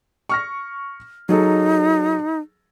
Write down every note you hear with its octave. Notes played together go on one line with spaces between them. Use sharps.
C#6 F6 A#6
F#3 D#4 G#4 A4